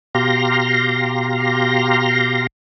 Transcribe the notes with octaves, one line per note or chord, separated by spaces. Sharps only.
B2 G4 F5 A#5 C6 A#6